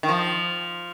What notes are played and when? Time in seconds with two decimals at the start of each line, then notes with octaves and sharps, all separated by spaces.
0.03 D#3
0.09 F3